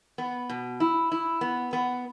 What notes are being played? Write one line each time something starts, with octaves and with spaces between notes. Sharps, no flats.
B3
B2
E4
E4
B3
B3